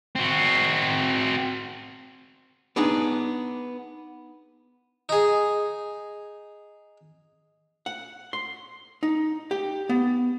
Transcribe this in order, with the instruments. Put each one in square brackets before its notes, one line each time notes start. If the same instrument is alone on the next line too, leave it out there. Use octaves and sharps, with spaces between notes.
[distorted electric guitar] C4 F#4
[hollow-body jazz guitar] B3 D4 D#4 G#4
[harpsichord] D#4 G#4
[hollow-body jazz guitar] F#5
C6
D#4
G4
B3